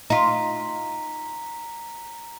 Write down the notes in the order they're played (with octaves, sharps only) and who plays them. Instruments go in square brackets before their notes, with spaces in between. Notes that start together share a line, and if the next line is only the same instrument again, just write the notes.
[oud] D#4 F4 [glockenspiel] A#5 B6